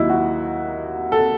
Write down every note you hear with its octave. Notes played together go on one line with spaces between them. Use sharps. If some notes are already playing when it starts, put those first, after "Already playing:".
Already playing: D#2 D#3 F#3 D#4 E4
F#4
A4